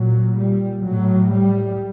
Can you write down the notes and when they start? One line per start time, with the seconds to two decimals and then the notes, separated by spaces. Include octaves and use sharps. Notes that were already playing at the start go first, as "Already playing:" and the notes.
Already playing: A#2 F#3
0.39 G3
0.85 A2 F#3
1.33 G3